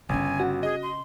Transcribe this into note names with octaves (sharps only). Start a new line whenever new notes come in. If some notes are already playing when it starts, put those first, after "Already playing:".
G1 C#3 C#4 G#5
F#4
G#4 D#5
C6